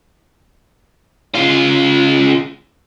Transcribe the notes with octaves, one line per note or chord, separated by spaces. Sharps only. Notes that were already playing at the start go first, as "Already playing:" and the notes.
C#3 F4